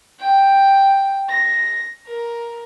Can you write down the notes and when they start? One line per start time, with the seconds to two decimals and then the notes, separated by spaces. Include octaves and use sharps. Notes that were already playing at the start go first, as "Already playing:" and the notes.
0.20 G5
1.29 A#6
2.07 A#4